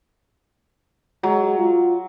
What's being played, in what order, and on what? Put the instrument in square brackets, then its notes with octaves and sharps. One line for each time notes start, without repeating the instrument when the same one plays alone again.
[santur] F#3 [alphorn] G#3
[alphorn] F4